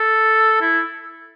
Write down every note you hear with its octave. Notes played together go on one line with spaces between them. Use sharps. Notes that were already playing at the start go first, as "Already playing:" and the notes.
Already playing: A4
E4